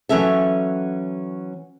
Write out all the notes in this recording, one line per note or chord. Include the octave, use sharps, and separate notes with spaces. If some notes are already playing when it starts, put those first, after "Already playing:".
E3 F#3 C#4 A4 E5